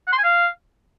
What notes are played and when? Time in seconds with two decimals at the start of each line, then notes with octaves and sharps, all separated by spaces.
0.07 F#5
0.12 C6
0.18 G#5
0.23 F5